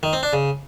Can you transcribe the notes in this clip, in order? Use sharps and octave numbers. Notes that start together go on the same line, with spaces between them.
D#3
C4
D4
C#3